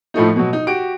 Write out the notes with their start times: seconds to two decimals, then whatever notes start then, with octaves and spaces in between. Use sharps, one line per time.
0.14 A2 F3 A3 D#4
0.36 B2 F#3
0.53 D#4
0.67 F#4 G4 D7